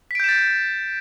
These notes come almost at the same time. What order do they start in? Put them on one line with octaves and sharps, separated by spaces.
B6 D7 G6 E7 A6